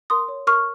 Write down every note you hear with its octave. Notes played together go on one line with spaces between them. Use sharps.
A#4 C6 D#6
C#5
A#4 C#6 F6